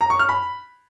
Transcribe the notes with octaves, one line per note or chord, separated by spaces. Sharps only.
A#5
C#6
F6
B5